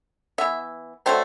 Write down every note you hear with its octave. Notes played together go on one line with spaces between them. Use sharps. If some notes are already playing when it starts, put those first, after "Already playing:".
E3 B3 E5
D3 F#3 A3 C4 C5